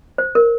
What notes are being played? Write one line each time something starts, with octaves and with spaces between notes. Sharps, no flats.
C5
A#4